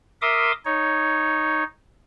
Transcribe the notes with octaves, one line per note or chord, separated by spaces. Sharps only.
A#4 E5 C6 D6 D#6
D#4 C#5